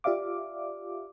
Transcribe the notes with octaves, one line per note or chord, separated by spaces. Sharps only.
F4 G4 D5 E5 F5 D6